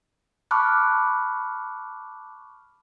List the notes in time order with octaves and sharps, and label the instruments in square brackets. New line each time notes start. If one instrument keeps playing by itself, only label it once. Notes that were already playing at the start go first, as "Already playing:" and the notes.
[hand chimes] A5 B5 C#6 D6 F6 F#6